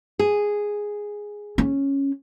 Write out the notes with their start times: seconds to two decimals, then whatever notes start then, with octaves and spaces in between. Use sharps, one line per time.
0.19 G#4
1.58 C#4